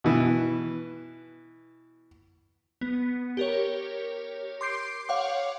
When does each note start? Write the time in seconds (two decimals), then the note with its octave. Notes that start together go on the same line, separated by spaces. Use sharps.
0.04 B2 E3
2.81 B3
3.37 G4 A#4 C#5
4.61 C6 D6 G6 C7 D7
5.09 C#5 F5 F#5 D6